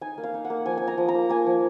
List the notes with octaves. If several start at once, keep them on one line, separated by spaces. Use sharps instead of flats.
D#4 G#5
A#3
F5
D#4
F#5
A#3
F3 G#5
D#4 G#5
A#5
F3
A#5
A#3
A#3 G#5
F3